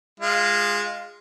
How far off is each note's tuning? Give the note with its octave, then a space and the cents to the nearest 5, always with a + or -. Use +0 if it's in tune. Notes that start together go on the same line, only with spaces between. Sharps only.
G#3 -15 F4 +0